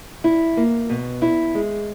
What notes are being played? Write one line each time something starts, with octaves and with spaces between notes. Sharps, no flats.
E4
A#3
B2
E4
G#3